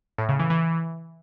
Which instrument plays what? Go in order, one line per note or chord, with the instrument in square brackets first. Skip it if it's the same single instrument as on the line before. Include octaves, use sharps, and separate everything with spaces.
[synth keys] A2
C#3
E3
E3